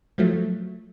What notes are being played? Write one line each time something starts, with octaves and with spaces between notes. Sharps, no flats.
F3 F#3 A3